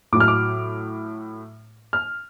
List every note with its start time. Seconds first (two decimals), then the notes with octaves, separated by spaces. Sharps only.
0.13 A2 F#3 D6
0.20 F6
0.28 D6
1.93 F6